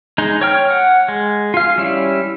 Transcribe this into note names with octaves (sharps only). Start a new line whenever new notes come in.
G#3 D#4
C#5 G5 F6
F#5
G#3
F4 F5
G3 C#4 E4